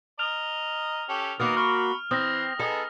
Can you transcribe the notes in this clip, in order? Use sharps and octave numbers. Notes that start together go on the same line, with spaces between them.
D#5 A#5 F6 F7
C#4 G4 A4
D#3 A#3 B3 F#4 A#4 D#6
B5 C#6 F6
E3 C4 D#6 A#6
B3 D#4 G#4 A4